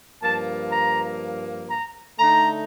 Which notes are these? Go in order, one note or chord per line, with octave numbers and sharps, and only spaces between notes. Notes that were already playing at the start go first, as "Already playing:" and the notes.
G2 F3 A#3 A5
A#5
A#5
D3 A3 D#4 A#5